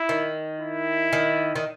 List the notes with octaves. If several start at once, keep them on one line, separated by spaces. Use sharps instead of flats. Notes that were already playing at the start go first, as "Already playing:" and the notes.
Already playing: E4
D#3
E4
D#3
D#3